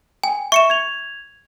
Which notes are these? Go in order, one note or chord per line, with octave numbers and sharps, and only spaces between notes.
G5 G#5
E5 C#6 C#7 E7
G#6 F7